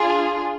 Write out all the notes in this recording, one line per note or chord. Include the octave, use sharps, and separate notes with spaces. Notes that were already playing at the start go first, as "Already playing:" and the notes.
Already playing: D4 F4 G#4